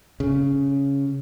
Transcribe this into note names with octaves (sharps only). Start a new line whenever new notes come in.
C#3